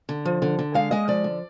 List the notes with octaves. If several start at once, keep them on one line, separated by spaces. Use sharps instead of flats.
D3
F3
D3
D3
G#3 F5
G#3 D#5
F3 D5
D3